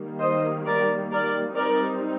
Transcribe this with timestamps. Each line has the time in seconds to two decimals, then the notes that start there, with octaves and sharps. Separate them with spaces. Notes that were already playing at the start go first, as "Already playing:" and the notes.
Already playing: D#3 G3 A#3
0.20 C5 D#5
0.65 A#4 D5
1.11 A#4 D5
1.56 G3 C4 D#4 A#4 D5